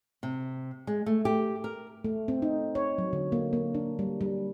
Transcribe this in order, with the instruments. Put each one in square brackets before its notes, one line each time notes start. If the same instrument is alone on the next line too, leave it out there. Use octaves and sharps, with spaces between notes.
[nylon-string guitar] C3
G#3
A3
G4
A#4
[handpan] A3
C4
D#4
C#5
F#3
D3
A#3
A#3
D4
G3
G3